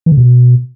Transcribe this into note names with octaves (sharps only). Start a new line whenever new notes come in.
E3
D3
B2